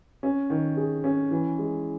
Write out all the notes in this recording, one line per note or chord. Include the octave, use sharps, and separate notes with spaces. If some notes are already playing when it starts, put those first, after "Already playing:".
C#4
D#3
G#4
C#4
E3
G#3